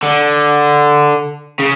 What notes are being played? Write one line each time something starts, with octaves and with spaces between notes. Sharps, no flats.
D3
C#3